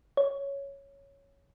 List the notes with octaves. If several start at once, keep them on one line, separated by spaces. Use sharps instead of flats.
C#5